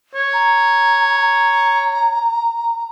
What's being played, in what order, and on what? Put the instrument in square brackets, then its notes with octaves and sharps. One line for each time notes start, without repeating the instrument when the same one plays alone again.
[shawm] C#5
[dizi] A#5